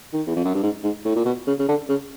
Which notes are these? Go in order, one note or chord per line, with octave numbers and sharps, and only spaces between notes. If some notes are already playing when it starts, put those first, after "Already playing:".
D#3
E2
F2
F#2
G2
G#2
G#2
A2
A#2
B2
C#3
C#3
D3
C#3